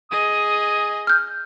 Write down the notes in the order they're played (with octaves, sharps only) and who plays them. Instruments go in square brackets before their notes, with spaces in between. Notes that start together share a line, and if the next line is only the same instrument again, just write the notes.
[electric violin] G#4 D#5 [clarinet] D#6
[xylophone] F6 G6